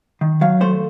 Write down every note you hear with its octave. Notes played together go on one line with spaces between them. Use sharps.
D#3
F#3 F5
A3 C5